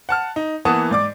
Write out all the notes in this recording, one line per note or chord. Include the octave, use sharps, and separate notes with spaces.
F#5 A5 F6
D#4
E3 A#3 B3 F#5 A5 D#6
G#2 D5 D6